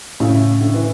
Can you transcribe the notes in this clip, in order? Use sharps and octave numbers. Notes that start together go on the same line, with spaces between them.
A2 C#3
D3
E3